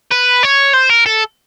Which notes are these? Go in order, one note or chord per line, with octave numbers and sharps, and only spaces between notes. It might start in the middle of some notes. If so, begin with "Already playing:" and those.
B4
C#5
C5
A#4
A4